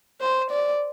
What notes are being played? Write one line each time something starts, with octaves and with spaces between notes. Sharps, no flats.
C5
D5